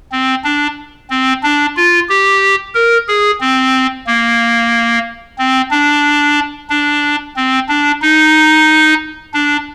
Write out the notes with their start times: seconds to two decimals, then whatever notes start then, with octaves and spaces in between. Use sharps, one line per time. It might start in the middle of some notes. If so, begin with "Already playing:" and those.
0.12 C4
0.44 D4
1.10 C4
1.43 D4
1.77 F4
2.09 G4
2.75 A#4
3.08 G#4
3.41 C4
4.07 A#3
5.39 C4
5.71 D4
6.70 D4
7.36 C4
7.69 D4
8.02 D#4
9.34 D4